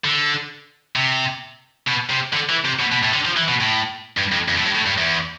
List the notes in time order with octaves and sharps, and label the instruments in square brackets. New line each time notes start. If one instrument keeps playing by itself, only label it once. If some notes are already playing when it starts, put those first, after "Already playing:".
[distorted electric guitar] D3
C3
B2
C3
D3
E3
C3
B2
B2
A2
D3
F3
E3
B2
A2
G2
F2
F2
A2
G2
A2
G2
E2